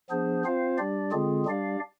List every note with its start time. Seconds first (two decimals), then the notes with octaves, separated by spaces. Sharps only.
0.10 F3 B3 D4 G#4 C5
0.44 C4 F4 C5 F5
0.78 G3 D4 G4 D5
1.12 D3 G#3 C4 F4 G#4
1.45 G3 D4 G4 D5 F5